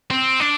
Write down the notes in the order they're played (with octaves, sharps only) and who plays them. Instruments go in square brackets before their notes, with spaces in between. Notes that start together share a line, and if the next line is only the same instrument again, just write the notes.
[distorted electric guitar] C4
D4